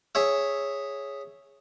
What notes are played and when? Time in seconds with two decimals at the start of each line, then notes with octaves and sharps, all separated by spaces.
0.15 G#4 C#5 E5